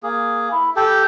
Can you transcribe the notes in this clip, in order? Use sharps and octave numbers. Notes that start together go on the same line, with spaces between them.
A#3 G#4
E4
G4 A4